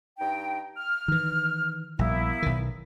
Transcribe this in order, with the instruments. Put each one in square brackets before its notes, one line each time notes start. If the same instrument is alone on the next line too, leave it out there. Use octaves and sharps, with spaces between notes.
[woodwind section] G2 D#4 G5
F6
[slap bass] D#3 E3
[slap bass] A#1 G3 [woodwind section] A#3 B3 E4
[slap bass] B1 D#3